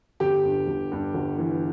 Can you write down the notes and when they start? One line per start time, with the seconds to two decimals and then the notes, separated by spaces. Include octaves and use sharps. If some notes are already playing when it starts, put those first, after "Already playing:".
0.20 G1 G4
0.44 G2
0.68 G1
0.92 G2
1.14 G1
1.38 E3